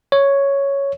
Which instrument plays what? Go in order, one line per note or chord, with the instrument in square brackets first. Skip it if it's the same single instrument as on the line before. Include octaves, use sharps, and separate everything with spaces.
[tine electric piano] C#5